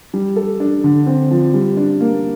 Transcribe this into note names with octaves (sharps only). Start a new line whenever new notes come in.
G3
A4
D4
D3
C4
F3
G3
D4
A#3